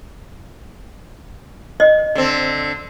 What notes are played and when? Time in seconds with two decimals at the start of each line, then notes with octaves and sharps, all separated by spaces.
1.80 D#5
2.15 D3 C4